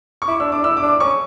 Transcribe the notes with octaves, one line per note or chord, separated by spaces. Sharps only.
C#6
E4 D6
D4 E6
D4 D6
E4 E6
D6
D4
D6
C#4 C#6